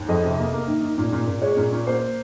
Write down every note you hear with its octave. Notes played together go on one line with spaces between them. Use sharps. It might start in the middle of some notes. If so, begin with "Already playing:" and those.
Already playing: D#2
F2 D#5
C3
A#3
A#3
D#3
D#3
A#2
A#2
A#2
G#3 C#5
A#2
A#2
A#3 C5